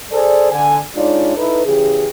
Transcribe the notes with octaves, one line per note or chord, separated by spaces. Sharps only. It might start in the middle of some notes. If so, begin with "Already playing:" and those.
G#4 A4 C5 D5
D3 G#5
G#3 D4 D#4 F4 C#5 D5
D#4 E4 A4 B4
C#3 E3 G4 G#4